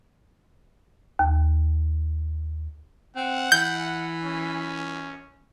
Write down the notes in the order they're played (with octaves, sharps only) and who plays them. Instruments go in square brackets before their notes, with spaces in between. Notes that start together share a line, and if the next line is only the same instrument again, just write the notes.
[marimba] D#2
[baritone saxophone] C4 [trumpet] F#5
[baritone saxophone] E3 [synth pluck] G6
[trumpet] C#4